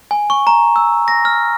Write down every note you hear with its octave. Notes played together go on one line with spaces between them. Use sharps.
G#5
C#6
A#5
E6
A#6
F6